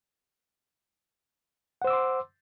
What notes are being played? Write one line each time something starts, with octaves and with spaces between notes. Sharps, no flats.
C5 F#5 C6 D6 E6